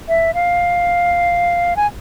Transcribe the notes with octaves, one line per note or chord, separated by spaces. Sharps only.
E5
F5
G#5